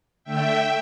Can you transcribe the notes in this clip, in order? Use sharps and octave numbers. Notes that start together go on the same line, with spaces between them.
D3 A3 E5 G5